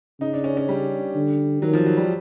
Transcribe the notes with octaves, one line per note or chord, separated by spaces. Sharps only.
C#3 D#4
D4
C#4
C#4
G3
D3
D#3 F#3
F3
F#3
G3